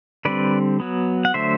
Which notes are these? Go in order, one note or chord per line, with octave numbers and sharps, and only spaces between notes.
D3 G3 C4 B4 D5
F#3 B3
F#5
D3 F#3 A3 C5 E5